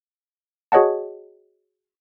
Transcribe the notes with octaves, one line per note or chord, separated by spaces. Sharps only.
F#4 G#4 C#5 D#5 F#5 A5